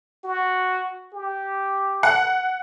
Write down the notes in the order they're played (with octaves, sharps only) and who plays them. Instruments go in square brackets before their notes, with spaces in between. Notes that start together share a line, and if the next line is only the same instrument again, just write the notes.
[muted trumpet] F#4
G4
[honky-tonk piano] F#5